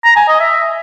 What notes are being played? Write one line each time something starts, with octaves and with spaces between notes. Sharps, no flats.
A#5
G#5
D#5
E5